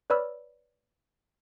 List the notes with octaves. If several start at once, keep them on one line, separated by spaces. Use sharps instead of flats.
B4 C#5 D5 B5 E6 F6